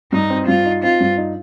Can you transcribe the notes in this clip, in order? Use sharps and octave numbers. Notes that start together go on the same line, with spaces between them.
G2 D#4
C4
G2 F4
D#4
C4 F4
G2
D#4